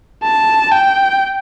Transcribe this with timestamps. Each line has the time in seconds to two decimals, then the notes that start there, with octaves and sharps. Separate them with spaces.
0.23 A5
0.71 G5